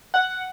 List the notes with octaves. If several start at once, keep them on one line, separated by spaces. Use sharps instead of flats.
F#5